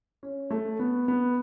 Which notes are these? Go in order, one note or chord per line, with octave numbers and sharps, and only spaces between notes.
C#4
A3
B3
B3